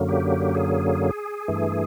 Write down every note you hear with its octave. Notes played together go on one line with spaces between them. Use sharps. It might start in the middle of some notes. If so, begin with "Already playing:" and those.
Already playing: F#2 D3 F#3 A#3
G4
G#4
G2 E3 A3